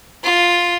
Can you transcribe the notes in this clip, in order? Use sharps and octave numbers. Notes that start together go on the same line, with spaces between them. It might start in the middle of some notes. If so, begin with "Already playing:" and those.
F4